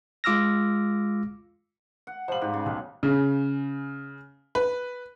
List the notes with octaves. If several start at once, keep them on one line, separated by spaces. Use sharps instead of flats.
G#3 F4 D6 E6 F6 A#6
F#5
F3 G3 C5 F#7
G#2 G4
C#3
B1 G#3
C#3
B4